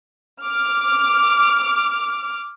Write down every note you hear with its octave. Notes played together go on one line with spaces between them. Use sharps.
D6 F6